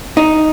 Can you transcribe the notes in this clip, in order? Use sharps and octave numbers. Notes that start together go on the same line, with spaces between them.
D#4